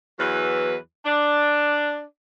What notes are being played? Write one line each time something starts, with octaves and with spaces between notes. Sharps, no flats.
E2 E3 F#3 B4
D4